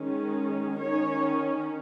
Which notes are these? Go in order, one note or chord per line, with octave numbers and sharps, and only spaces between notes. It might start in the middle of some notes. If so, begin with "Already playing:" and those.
Already playing: D#3 G#3 C#4
D#3 C#4 C#5